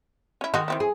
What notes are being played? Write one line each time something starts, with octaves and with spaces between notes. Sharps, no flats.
C#4 E4
D#3 G#3 D#4 F#4
E3 C4 E4
G#4